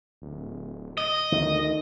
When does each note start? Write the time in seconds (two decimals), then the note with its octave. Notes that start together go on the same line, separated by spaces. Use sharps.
0.22 D1
0.98 D#5
1.32 D2 D#3